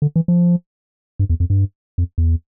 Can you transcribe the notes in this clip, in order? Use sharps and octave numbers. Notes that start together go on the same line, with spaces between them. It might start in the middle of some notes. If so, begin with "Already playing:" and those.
D3
E3
F3
G2
E2
F2
G2
F2
E2